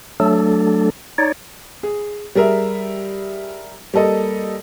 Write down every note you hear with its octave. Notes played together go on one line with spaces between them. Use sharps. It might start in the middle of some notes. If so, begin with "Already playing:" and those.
F#3 A3 D4 A4
D#4 C#5 D5
G#4
G3 G#4 A#4 E5
G3 A#3 A4 D#5